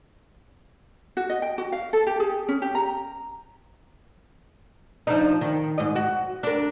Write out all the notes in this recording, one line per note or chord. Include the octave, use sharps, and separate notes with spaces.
F#4
D#5
G5
F#4
F5
A4
G4
G#4
C#4
G4
A#5
F3 D4 D#4
D#3
G#2 D#5
F#4
D4 A#4